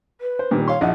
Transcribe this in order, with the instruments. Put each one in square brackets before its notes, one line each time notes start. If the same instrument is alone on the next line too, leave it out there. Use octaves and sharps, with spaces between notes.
[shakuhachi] B4
[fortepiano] C5
A#2 D#3 G3
[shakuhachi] C#5 [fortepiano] F5 C6
[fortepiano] A#1 E4 D#5 [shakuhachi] F#5